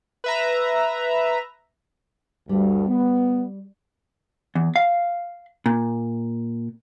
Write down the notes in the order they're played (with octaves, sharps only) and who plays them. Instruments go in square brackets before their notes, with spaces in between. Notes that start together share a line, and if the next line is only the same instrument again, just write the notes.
[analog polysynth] B4 E5 A#5
[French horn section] D2 G2 [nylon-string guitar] G3
[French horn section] B3
[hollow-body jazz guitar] E2
F5
A#2